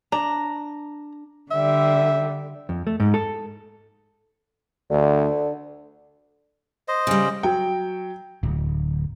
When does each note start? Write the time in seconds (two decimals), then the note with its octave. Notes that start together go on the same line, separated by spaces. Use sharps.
0.12 D4 A#5
1.51 D3 G3 E5
2.69 F2
2.87 A3
3.00 G#2
3.14 A4
4.90 D2 D3
6.88 C5 D#5
7.07 C#3 G3
7.43 F#3 G5
8.43 D1